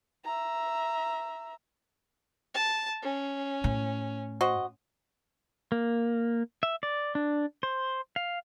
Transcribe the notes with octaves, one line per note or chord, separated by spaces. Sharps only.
E5 A#5
A5
C#4
A2
F#4 C5 D#5
A#3
E5
D5
D4
C5
F5